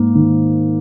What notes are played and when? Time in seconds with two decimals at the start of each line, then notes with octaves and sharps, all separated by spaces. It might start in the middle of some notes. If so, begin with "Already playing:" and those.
Already playing: G#2 A#3
0.15 D#3